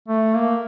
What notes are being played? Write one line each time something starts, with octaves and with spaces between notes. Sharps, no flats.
A3
A#3